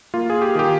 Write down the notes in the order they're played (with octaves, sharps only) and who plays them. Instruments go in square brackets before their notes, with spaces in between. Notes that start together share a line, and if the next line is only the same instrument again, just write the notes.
[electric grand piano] A#3 F4
G#4
G4
D#3 G4